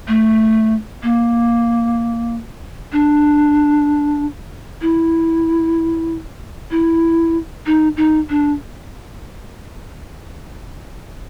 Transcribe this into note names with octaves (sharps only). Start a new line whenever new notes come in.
A3
A#3
D4
E4
E4
D#4
D#4
D4